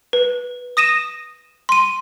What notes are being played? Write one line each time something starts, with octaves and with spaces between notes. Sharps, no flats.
B4
D#6 A#6 D#7 E7
C6 D#7